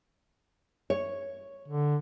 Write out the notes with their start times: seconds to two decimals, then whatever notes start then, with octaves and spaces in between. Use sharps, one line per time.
0.90 C#5
1.68 D3